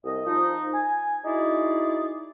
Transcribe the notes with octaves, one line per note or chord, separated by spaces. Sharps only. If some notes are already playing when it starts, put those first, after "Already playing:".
C2 D#5
F3 D#4
G#5
D#4 E4 F#4 G#4 D5